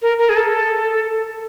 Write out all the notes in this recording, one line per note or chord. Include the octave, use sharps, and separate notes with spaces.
A#4
A#4
G#4
A4